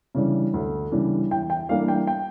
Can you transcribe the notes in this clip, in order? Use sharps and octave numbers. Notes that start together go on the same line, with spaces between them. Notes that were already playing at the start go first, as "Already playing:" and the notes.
C#3 E3 G3 D4
D2
C#3 E3 G3 D4
E2 G5
G5
E3 G3 A#3 D4 F5
G5
G5